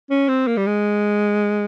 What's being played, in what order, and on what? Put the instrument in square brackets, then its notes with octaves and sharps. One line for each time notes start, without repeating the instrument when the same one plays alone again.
[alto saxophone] C#4
C4
A#3
G3
G#3